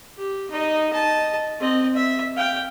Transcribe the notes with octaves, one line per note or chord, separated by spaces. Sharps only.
G4
D#4 D#5
D#5 A5
C4 D#5
E5
F5 G5